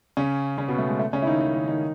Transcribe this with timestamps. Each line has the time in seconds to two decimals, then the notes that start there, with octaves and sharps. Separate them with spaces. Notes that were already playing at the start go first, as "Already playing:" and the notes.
0.17 C#3 C#4
0.58 C#3 C#4
0.68 B2 B3
0.78 A3
0.89 G#3
0.99 A3
1.13 C#3 C#4
1.22 E4
1.27 D#3 D#4
1.41 D#3 D#4
1.54 D#3 D#4
1.68 D#3 D#4